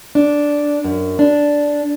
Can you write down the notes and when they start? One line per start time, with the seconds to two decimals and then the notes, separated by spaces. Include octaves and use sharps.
0.15 D4
0.84 F#2
1.19 D4